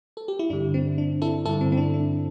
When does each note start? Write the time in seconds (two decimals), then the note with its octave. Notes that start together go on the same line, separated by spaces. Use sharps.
0.17 A4
0.28 G4
0.39 E4
0.50 G2 D3 D4
0.74 C4
0.98 D4
1.22 E4 A4
1.45 G2 D3 E4 A4
1.61 C4
1.72 C4
1.77 D4
1.94 D4